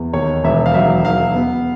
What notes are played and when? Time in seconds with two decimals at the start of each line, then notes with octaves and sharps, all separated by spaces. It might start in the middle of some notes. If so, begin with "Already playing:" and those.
Already playing: E2
0.13 D#2 C#5
0.44 E1 E5
0.66 F5
0.74 F#3 E5
1.05 E1 F5
1.35 B3